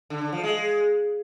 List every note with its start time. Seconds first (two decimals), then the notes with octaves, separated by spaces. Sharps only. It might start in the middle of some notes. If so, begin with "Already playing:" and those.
0.10 D3
0.21 D3
0.32 F3
0.43 G#3